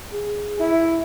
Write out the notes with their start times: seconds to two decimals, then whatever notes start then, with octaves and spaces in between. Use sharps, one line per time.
0.12 G#4
0.60 E4